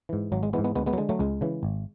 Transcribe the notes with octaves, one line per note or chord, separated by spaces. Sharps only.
G#2 E3
G#1 F#3
G#3
G#2 E3 G#3 B3
G#3 B3
D2 G#3 B3
G#3 B3
F#3
D3 G#3
F#3 A3
C#2 G#3
C#3 E3
G#1